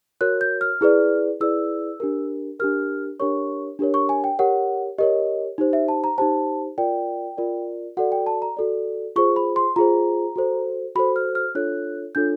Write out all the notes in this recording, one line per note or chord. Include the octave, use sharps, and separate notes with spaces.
F#4 A#4 C#5 F#6
G6
F6
E4 G#4 B4 D5
E4 G#4 B4 D5 E6
D4 G4 A#4
D4 G4 A#4 F6
D4 G4 A#4 C#5 C#6
D4 G4 A#4 C#5
C#6
G#5
G5
G4 A#4 C#5 F#5
G4 A#4 C#5 D#5
D#4 G4 C5
E5
A5
A#5
D#4 G4 C5 A5
F4 A#4 D5 G5
F4 A#4 D5
F#4 A4 D5 F#5
G5
A5
A#5
F#4 A4 D5
F4 G#4 C5 C#6
B5
C6
F4 G#4 C5 A#5
F#4 A4 C5
F#4 A4 C5 B5
F6
F6
D4 F4 A4 C#5 F#6
D4 F4 A4 C#5 G6